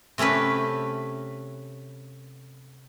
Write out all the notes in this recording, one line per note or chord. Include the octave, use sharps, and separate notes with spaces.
C3 A3 C#4 G4 B4